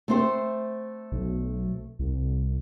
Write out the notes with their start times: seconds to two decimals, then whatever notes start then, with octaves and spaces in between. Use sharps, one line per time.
0.08 A3 C4 C5
1.12 B1
1.99 C2